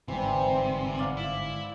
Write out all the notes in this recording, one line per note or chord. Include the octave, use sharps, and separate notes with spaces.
G1 G#2 C3 E3 G3 C5
D5 F5 F#5
E4